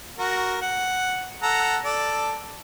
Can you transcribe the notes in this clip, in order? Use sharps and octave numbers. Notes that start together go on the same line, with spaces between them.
F#4 A#4
F#5
A4 F#5 A#5
A4 D5